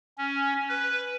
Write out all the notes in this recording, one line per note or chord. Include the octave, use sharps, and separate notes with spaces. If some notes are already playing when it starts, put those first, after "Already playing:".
C#4
B4